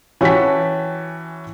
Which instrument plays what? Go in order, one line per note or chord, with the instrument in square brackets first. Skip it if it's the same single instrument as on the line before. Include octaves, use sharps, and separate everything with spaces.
[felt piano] E3 C#4 F#4 G5 A5 B6